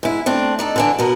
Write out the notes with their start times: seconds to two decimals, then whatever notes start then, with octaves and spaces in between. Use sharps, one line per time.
0.03 G#2 E4
0.26 A3 C4 D4
0.59 D4 D#4 A4
0.76 D3 E3 D4
0.99 B2 B3 A#4